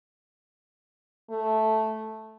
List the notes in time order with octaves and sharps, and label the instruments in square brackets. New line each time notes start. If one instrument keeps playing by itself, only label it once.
[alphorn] A3